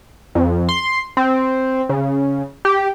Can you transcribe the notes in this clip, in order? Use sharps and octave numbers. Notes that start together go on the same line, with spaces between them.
F2
C6
C4
C#3
G4